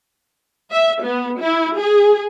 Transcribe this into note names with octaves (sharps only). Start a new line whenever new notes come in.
E5
B3
E4
G#4